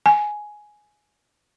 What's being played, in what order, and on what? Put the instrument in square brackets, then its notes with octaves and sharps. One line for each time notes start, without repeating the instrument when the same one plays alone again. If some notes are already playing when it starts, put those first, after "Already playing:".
[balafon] G#5